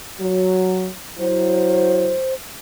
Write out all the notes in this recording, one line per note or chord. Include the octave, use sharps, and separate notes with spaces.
F#3
F#3 E4 C5